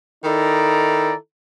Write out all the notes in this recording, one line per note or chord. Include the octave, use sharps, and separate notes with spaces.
D#3 D#4 E4 A4 D5 A#5